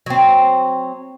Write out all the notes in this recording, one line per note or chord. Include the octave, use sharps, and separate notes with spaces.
F#3 C4